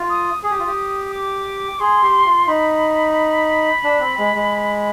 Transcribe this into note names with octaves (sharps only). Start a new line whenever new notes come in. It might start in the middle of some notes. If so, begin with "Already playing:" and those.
Already playing: F4
D#6
G#4 D#6
G4
F4
G4
D6
G#4 C6
G4
F4
D#4 B5
D4
C4
G#3
G#3